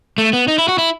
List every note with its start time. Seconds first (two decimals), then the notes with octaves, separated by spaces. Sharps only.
0.18 A3
0.33 B3
0.48 D#4
0.58 E4
0.68 F#4
0.78 E4